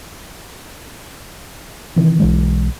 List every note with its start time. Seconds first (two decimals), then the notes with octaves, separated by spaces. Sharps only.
1.96 C3 D#3 E3
2.20 B1 E3 G#3